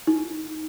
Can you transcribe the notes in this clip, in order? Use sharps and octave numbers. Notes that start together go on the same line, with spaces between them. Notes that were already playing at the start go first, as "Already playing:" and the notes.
D#4